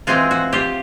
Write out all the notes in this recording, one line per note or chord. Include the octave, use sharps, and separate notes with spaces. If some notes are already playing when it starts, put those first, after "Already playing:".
E3 G#3 C4 F4 F#4 G#4
F#4
F4 G4